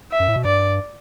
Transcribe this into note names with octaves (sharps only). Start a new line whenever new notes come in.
E5
F#2
A2
B2
G2 D5